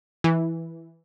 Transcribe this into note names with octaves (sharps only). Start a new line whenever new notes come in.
E3